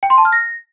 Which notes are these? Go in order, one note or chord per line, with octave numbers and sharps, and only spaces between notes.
G5
C6
A5
F6
A#6